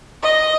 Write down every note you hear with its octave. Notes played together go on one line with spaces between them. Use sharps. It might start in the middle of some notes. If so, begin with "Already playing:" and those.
D#5